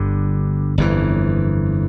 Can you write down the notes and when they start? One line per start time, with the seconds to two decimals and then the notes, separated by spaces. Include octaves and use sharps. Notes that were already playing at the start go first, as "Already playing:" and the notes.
Already playing: G1 G2 D3
0.78 G1 F2 C3 E3